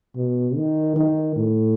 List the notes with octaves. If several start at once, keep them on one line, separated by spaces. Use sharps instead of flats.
B2
D#3
D#3
A2